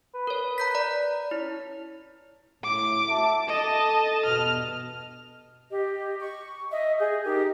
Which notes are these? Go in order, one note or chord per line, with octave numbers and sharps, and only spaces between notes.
B4
A#4 C#5
A#5 G6 B6
D5 A#5
C#4 E4
A2 D6
F#4 E5 A5
A4 D#5 A5
E2 G2 B2 F6
G4 D#5
C#6
D#5 E5
G#4 G#5 G6
D#4 G4 A#4 D#5